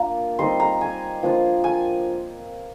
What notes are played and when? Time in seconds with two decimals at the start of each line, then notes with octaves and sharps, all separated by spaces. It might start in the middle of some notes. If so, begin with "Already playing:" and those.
Already playing: A#3 D4 F4
0.39 G3 C4 D#4 C6
0.60 A#5
0.81 G#5
1.23 F3 A#3 D4 F4
1.64 G#5